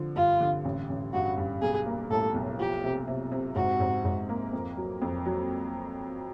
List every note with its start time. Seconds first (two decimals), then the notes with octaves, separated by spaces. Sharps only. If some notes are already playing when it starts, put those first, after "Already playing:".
Already playing: D3 F3
0.16 G2 F4
0.40 D3
0.65 A1
0.89 A1
1.13 G2 F#4
1.38 G2
1.62 B1 G#4
1.86 A#3
2.10 A2 A4
2.34 B1
2.59 F3 G4
2.84 C3
3.08 C3
3.32 C3
3.56 G#2 F#4
3.80 G#2
4.05 G#2
4.29 A#3
4.53 F2
4.77 F#3
5.01 F2
5.26 F#3